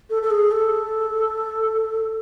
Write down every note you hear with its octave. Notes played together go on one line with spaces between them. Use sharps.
A4
A4
G#4
A4